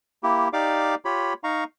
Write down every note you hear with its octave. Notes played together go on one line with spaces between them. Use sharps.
A#3 E4 G4
D#4 G4 D5 F5 D6
F4 G4 C#5 B5
D#4 F5 A#5 C#6